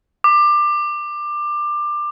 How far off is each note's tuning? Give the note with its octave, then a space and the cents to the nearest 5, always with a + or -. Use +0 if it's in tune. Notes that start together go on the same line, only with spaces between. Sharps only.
D6 +20